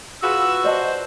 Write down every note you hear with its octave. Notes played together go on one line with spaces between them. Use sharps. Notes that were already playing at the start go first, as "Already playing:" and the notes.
F4 F#4 G#4 B4 E6
C5 D5 D#5 A5